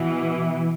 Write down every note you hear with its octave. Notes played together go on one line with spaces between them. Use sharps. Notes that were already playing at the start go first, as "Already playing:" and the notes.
Already playing: B2 E3